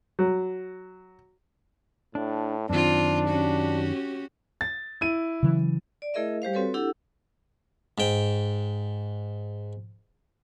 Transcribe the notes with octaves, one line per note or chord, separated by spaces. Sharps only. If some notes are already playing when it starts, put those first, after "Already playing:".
F#3
A2 D4
F#2 D#3 C4 D4 F4
C#4 F#4 G4
A6
E4 D#7
C#3 E3 F#3
D5
A3 E4 G#4 A#4 D#5 E5
G3 G4 C5 F5
C4 F#4 A4 B4 C#5
D4 E4 G4 A4 F#5 E6
G#2 G5